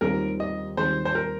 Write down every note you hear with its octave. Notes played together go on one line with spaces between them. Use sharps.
D#2 D#3 G3 C4 F4 A#4
D#5
D#2 D#3 G3 C4 F4 C5
C5
A#4